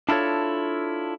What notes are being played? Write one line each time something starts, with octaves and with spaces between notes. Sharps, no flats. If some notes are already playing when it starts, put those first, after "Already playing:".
D4 E4 F4 A4 C#5